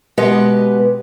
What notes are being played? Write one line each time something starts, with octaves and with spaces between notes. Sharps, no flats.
B2 G#3 G4 B4 D#5 F#5